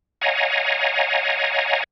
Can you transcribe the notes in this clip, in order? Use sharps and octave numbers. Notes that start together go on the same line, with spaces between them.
C#5 D#5 F5 F#5 G#5 A#5